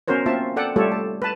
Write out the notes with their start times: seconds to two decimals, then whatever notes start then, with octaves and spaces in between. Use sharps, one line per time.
0.08 B3 C#4 F#4 A#4 C5 C#5
0.26 A#3 C4 F4 E5 A5
0.56 A4 D5 F#5 G5
0.76 G3 A3 F4 G4 A4 C#5
0.92 A5
1.22 B4 A5